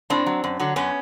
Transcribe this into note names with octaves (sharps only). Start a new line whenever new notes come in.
A2 C4 D4
F#3
F#2
D3 F#3
F#2 B3 C#4